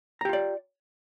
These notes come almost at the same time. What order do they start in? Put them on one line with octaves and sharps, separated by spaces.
A#5 G4 F4 D5